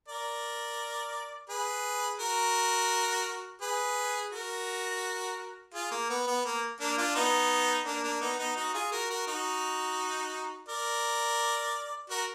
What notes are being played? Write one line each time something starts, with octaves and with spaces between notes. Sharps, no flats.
A#4 D5
G#4 B4
F#4 A#4
G#4 B4
F#4 A#4
F4 G#4
A#3
B3
B3
A#3
A#3 D4
D4 F4
B3 D#4
A#3 D4
A#3 D4
B3 D#4
B3 D#4
D#4 F#4
F4 G#4
F#4 A#4
F#4 A#4
D#4 F#4
A#4 D5
F#4 A#4